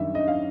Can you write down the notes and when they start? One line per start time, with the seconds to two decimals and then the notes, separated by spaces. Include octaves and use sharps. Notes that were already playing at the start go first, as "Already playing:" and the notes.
Already playing: F#2 D#3 G3 E5
0.15 D#5
0.28 F5